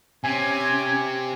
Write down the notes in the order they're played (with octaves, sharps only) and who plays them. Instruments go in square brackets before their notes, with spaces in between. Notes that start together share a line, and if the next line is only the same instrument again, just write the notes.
[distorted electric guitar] C3 [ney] C#4 [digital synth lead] G#5